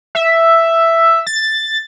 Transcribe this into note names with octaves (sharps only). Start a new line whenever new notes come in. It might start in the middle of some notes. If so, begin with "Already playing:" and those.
E5
A6